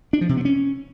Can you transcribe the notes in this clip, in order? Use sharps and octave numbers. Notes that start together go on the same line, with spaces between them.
D4
F3
C3
B3
C#4